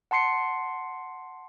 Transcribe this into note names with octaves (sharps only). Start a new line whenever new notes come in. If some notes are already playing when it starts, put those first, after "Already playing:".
F#5 A5 C6 C7 C#7